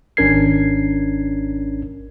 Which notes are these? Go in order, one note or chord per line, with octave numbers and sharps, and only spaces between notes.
G#1 C#4 D4 A#4 G#6 C7